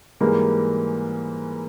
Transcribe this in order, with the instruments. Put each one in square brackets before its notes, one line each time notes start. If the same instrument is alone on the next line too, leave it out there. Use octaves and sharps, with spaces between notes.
[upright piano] G#2 E3 G3 A#3 G#4 A#4